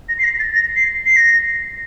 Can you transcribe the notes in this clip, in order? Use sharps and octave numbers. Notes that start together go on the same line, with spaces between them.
A#6
C7
A#6
A6
A#6
C7
C7
A#6